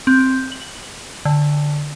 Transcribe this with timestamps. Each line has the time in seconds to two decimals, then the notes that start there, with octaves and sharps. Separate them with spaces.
0.07 C4
0.52 F#7
1.25 D3